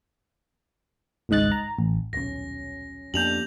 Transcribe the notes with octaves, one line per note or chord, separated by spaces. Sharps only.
G#1 C#2 G#2 D#5 F#6 A6
A#5
A1
D#1 B1 F#3 C#4 A#6
F2 A#3 B3 D4 G4 G6 F7 F#7